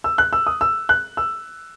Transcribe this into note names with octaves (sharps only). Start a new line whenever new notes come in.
E6
F#6
E6
D#6
E6
F#6
E6